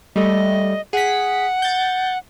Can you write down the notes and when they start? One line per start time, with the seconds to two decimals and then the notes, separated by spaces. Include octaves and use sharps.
0.16 G3 A3 D#5
0.93 G#4 F#5 B6
1.62 G6 A6